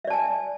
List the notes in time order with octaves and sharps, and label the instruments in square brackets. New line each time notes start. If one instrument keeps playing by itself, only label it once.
[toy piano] E5
D5
A5
G#5